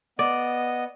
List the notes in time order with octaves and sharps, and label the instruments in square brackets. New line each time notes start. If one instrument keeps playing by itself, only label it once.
[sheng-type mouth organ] B3 D#5 [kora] D5